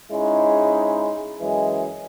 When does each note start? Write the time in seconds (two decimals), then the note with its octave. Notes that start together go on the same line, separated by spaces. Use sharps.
0.12 G#2 G#3 C#4 D#4 E4
1.40 F#2 E3 G#3